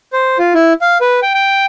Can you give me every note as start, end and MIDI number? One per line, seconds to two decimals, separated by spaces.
0.13 0.38 72
0.39 0.53 65
0.54 0.73 64
0.81 0.98 77
1.01 1.20 71
1.22 1.34 79
1.34 1.66 79